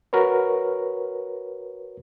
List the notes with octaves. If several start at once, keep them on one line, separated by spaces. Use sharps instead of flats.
F#4 A#4 B4 C#5